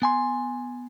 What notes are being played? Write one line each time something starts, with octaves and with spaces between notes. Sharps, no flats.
B3 G#5 C6